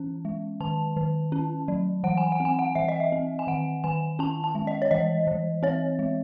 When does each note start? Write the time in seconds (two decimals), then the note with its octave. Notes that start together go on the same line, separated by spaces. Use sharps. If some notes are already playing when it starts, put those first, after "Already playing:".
Already playing: E3 C#4
0.25 G#3
0.61 D#3 A5
0.97 D#3
1.32 C#4
1.68 F#3
2.04 E3 F#5
2.18 G#5
2.32 F#5
2.40 C4
2.45 G#5
2.59 F#5
2.75 E3 E5
2.89 D#5
3.00 E5
3.12 C4
3.39 G#5
3.47 D#3 F#5
3.84 D#3 G#5
4.19 C#4 A5
4.44 A5
4.55 G#3
4.67 D#5
4.82 C#5
4.91 E3 D#5
5.27 E3
5.63 C4 C#5
5.99 G#3